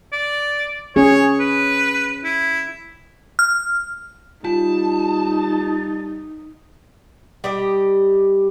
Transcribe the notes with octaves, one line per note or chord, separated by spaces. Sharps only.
D5
C#4 G#4 C#5
B4
E4
F6
G3 D#4 F4 A5
G3 G4 D#5